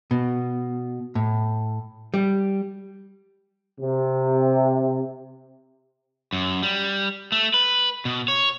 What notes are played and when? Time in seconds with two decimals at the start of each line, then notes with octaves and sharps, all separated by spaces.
0.11 B2
1.15 A2
2.14 G3
3.80 C3
6.33 F#2
6.63 G3
7.32 A3
7.54 B4
8.05 B2
8.28 C#5